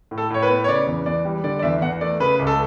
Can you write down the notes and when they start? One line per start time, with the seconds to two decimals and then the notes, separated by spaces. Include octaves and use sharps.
0.11 A2
0.18 A4
0.30 A2 C#5
0.42 B4
0.49 B3
0.64 C#5
0.68 C#3 D5
0.87 E2
1.06 E2 D5
1.25 G3
1.44 D3 D5
1.59 D5
1.62 E2 E5
1.81 E2 F#5
2.01 A3 D5
2.20 C#3 B4
2.39 C#2
2.47 A4